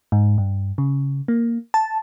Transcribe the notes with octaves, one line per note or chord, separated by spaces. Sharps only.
G#2
G2
C#3
A#3
A5